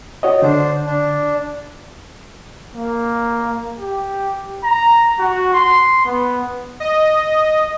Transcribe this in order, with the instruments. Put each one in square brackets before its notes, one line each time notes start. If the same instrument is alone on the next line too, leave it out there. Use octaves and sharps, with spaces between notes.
[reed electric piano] F#4 C#5 D#5
[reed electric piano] D3 [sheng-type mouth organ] D4 C5
[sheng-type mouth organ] D4
[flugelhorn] A#3
[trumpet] G4
A#5
F#4
C6
B3
[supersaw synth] D#5